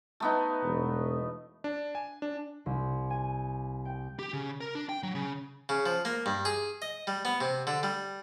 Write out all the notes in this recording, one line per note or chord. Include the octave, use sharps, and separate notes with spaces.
A3 B3 D#4
E1
D4
G#5
D4
C2
G#5
G5
G4
C#3
A#4
D4
G5
F#3
C#3
C#3
F3
A#3
G2
G#4
D#5
G3
B3
C3
D3
G3